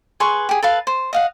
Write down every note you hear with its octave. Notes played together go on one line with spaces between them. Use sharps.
G#4 B4 C6 C#6
G4 G#4
A4 B4 F5
C5
D#5 F5 F#5